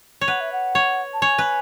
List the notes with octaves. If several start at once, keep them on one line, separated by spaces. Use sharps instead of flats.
C#5
B4 F#5
E5
F#5
C#5
A5
C#5 G#5
B4